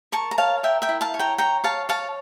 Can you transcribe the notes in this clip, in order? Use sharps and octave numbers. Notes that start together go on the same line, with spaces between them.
A#4 A5 C#6
A#5
C#5 F5 A5
A#4 E5 G5
E5 G5
E4
F5 A5
C#5
G5 A#5
C#5 G5 A#5
C#5 F5 A5
C#5 F5 A5